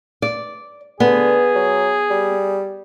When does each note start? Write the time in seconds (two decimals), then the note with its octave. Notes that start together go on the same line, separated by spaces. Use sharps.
0.22 D5
1.00 D3 B3 G#4
1.55 F#3
2.10 G3